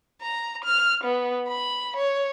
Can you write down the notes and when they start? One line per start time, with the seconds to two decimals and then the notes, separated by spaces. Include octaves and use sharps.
0.22 A#5
0.64 F6
1.04 B3
1.48 B5
1.96 C#5